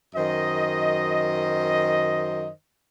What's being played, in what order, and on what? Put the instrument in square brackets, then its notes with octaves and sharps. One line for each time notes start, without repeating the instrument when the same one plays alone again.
[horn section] F#2 D#3 C5 D#5